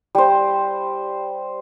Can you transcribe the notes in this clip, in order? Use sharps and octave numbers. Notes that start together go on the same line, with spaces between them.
G3 C5